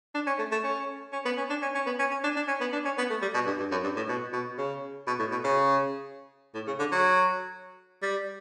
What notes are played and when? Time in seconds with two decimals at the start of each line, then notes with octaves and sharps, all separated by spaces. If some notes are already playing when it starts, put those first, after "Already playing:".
0.15 D4
0.27 C#4
0.39 A3
0.52 A3
0.64 C#4
1.13 C#4
1.25 B3
1.37 C#4
1.50 D4
1.62 C#4
1.75 C#4
1.87 B3
1.99 C#4
2.11 C#4
2.24 D4
2.36 D4
2.48 C#4
2.61 B3
2.73 D4
2.85 C#4
2.98 B3
3.10 A3
3.22 G3
3.34 B2
3.46 G2
3.59 G2
3.71 F#2
3.84 G2
3.96 A2
4.09 B2
4.33 B2
4.58 C#3
5.07 B2
5.19 A2
5.32 B2
5.44 C#3
6.55 A2
6.67 C#3
6.79 D3
6.92 F#3
8.02 G3